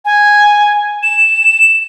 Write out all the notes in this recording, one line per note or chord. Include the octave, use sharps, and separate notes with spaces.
G#5
E7